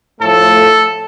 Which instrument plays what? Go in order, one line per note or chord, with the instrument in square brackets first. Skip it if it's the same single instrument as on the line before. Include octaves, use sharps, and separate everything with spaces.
[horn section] A2 F3 A3 A4